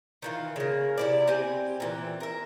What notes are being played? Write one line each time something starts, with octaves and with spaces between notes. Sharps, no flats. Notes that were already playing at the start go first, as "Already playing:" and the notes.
D#3 E3 F4
C#3 A#3
C3 E4 D5
C4 G4 G#5
A#2 E3 C4
A#4 E5